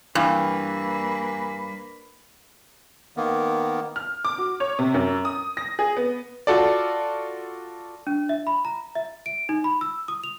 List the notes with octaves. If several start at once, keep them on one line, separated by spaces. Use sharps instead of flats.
G2 E3 A#3 B4
D#3 A#3 B3
F6
D6
F#4
C#5
C3
F#2
D#6
A#6
G#4
B3
F4 F#4 A4 D5
D4
E5
B5
A#5
E5
D7
D#4
B5
E6
D#6
F7